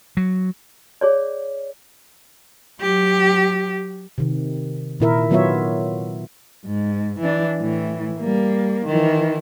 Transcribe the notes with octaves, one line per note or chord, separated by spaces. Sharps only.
F#3
G#4 C#5 D5
F#3 G4
C3 D#3
A#2 D#3 E4 A#4 E5
D#3 F#3 B3 F4 C#5 E5
G#2
E3 D4
A2 E3
G3 A#3
D#3 E3